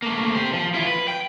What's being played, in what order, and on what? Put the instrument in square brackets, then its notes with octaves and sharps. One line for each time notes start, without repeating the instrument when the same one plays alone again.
[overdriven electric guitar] A3 A#3
G4 C5
F3
E4 F4
B4
G5